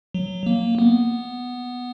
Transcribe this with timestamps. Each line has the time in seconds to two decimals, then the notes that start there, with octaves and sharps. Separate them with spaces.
0.14 F#3
0.46 A#3
0.79 B3